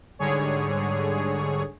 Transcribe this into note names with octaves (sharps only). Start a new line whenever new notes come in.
G#2 D3 G3 G#4 C#5